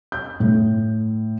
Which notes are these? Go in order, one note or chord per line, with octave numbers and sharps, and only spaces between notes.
G6
A2